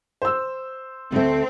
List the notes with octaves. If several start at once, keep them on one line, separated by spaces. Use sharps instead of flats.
C5 E6
D2 A3 C4